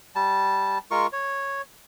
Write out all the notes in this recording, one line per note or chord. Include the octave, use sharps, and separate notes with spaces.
G3 A5
G#3 F4 A#4 C#6
C#5